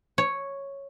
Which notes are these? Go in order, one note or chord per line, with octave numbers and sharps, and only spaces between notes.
C#5